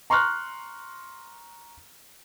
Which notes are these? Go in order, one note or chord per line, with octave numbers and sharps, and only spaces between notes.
A#5 C6 C#6 F6 F#6